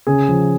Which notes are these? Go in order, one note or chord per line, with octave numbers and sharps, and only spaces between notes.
C#3 G#4
F3